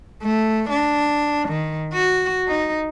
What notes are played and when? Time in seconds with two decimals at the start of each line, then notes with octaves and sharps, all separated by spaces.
0.23 A3
0.70 D4
1.49 D#3
1.94 F#4
2.48 D#4